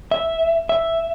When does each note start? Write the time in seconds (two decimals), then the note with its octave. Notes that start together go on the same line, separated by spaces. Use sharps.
0.11 E5
0.69 E5